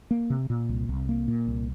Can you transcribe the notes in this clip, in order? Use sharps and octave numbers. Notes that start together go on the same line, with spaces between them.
A#3
C3
A#2
C2
C2
A#3
A#2
C2